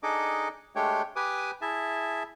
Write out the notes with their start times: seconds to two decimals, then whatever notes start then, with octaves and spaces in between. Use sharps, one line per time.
0.03 D4 D#4 G#4 A4 D#5 D6
0.76 G#3 A3 D4 G4 C#5 G5
1.16 G4 B4 G#5 D6 D#6
1.62 E4 G#4 E5 A5